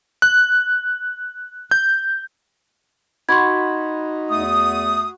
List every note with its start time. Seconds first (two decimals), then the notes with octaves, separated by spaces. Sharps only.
0.22 F#6
1.71 G6
3.29 D#4 F#4 B5 C6 G#6
4.30 E2 A3 D#6